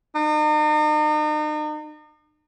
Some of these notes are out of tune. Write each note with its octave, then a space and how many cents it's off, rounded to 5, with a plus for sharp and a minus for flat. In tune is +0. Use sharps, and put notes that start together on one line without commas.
D#4 -40